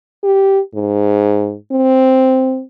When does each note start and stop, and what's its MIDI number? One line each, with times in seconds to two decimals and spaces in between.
0.23 0.60 67
0.75 1.55 44
1.72 2.62 60